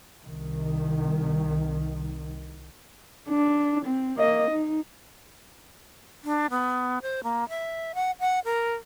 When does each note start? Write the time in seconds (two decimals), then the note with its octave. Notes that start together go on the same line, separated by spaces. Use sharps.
0.24 C2 D#3
3.29 D4
3.86 C4
4.18 A#3 D#5
4.51 D#4
6.24 D4
6.51 B3
7.02 C5
7.24 A#3
7.49 E5
7.95 F#5
8.20 F#5
8.45 A#4